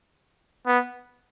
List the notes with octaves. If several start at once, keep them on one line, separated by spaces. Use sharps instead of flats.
B3